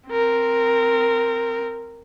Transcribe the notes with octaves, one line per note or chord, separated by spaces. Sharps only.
C4 A#4